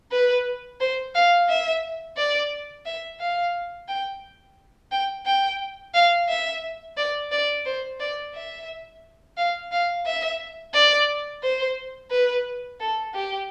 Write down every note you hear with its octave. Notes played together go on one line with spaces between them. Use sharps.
B4
C5
F5
E5
D5
E5
F5
G5
G5
G5
F5
E5
D5
D5
C5
D5
E5
F5
F5
E5
D5
C5
B4
A4
G4